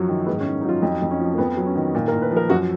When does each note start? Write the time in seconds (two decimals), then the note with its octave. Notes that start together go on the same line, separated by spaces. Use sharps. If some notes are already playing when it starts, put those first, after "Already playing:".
Already playing: F#2 F3 F#3 F#4
0.09 D#3
0.26 G#2 B3
0.40 C#4
0.45 G#2
0.61 D#4
0.65 F#3 F4
0.82 F2 D#4
1.02 F2
1.11 C#4
1.20 F3
1.34 A#3
1.38 F2 B3
1.57 F#3
1.66 C#4
1.75 D#3
1.95 A#2
2.08 A#4
2.13 A#2
2.22 B4
2.31 F3
2.36 A#4
2.49 F#2 F#4